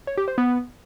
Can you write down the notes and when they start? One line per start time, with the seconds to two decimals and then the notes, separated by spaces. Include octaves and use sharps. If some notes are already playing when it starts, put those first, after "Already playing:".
0.07 C#5
0.17 G4
0.28 C5
0.38 B3